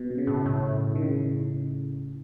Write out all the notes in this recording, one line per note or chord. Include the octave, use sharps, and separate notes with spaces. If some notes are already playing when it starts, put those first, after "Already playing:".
Already playing: B2
B2
C#3
A2
A2
D#3
C#3